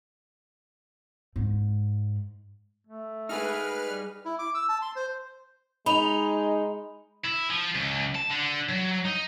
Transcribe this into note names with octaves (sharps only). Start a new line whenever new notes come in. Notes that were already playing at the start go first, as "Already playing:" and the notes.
G#2
A3
D#4 G#4 B4 F6
G3
E4
D6
E6
A5
C6
C5
G#3 D#4 B5 F7
E4
F3
C#2
A5
D3
F#3
D#4